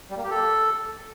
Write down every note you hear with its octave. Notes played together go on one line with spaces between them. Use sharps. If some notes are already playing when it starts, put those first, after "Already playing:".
G3
A#3
G4
A4